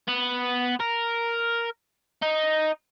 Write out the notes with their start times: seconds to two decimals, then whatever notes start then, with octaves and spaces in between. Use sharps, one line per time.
0.08 B3
0.80 A#4
2.22 D#4